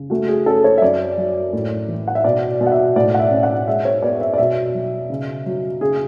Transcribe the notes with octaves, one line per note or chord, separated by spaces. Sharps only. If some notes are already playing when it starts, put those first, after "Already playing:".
Already playing: C#3
A3 F#4
G#4
C#4 A4
C#5
E5
F#2 D5
F#3
A2
E3
F#5
E5
B2 D5
B2
F#5
E5
A2 D5
F#5
E5
C#4
F#5
G#3 E5
C#5
B3 D5
E5
D5
B2 E5
F#3
C#3
F#3
C#3 G#4